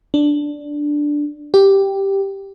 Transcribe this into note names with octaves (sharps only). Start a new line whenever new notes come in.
D4
G4